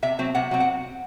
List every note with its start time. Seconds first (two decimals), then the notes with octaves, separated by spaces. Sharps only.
0.03 C3 E5
0.19 F#3 C4
0.35 C3 F#5
0.51 F#3 C4
0.60 F#5